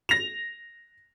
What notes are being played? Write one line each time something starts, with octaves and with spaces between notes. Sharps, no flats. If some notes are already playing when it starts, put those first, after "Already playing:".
A#6 F7